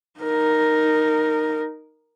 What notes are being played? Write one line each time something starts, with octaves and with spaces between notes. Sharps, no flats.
D#4 A#4